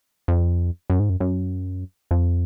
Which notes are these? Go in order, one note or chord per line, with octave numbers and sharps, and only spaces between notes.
F2
F#2
G#2
F#2
F#2
F2